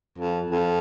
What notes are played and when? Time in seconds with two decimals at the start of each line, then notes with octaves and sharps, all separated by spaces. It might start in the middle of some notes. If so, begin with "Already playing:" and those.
0.18 F2
0.50 F2